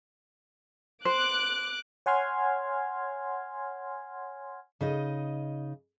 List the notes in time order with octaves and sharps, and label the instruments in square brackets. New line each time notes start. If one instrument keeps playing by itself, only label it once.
[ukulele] C5 [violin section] D6 F#6
[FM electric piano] C#5 F#5 G#5 C6 F6 G#6
[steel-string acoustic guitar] C#3 D#4 D#5